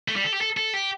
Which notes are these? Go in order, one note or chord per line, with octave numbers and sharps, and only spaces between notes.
A3
G3
A4
G4
A4
A4
G4